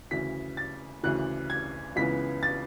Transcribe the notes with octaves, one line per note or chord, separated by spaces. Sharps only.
D2 C#3 E3 B6
A6
D2 C#3 E3 F#6
G#6
C#2 C#3 E3 B3 B6
A6